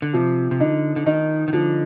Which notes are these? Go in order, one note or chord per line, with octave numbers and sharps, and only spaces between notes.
D3
C3 F3
C3
D3 D#4
D3
D#3 D#4
D#3
D3 F3